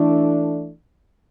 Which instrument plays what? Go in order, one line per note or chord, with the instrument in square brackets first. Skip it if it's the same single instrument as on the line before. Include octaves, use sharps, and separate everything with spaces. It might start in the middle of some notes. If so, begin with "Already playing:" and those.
Already playing: [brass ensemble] E3 A3 D4